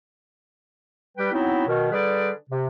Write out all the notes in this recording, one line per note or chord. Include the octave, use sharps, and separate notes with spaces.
G3 B4 G5
F#3 B3 C4 D#4 E4
B2 D#3
D3 G3 G#4 B4 D5
C3